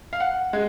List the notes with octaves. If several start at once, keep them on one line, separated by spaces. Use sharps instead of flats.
F5
F#5
G#3